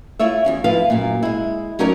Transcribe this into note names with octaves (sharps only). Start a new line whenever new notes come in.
E4 F4 C#5 E5
E2 G2 C#4
F3 E4 F4 B4 F5
F#2 A#2
G#3 E4
F#3 C#4 D#4 A#4 C#5 D5